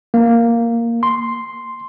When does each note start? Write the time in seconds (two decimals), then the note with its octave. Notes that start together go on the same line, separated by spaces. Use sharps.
0.14 A#3
1.03 C6